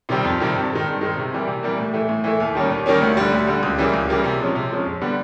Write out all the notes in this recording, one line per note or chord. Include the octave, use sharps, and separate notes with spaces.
C3 D#3 G3 C4
F2
C3 D#3 G3 C4
G2
D#3 G#3 C4
G2
D#3 G#3 C4
C3
E3 G3 A#3
C3
E3 G3 A#3
A2
E3 A3
A2
E3 A3
D#2
D#3 G3 A#3 C#4
D#2
D#3 G3 A#3 C#4
D2
D3 G3
D2
D3 G3
C#2
C#3 E3 G3 A#3
C#2
C#3 E3 G3 A#3
C3
F3 G#3 C#4
C3
F3 G#3 C#4
F2
D3 G3 B3